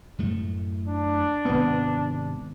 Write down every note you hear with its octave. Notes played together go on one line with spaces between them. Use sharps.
F#2 A2 A3
D4
G#1 C3 B3